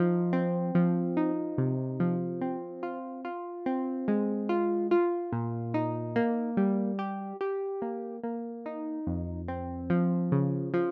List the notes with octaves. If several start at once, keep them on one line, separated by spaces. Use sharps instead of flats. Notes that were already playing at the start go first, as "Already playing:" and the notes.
Already playing: F3 D#4
C4
F3
D#4
C3
F3
C4
F4
F4
C4
G#3
F4
F4
A#2
D#4
A#3
G3
G4
G4
A#3
A#3
D#4
F2
C4
F3
C#3
F3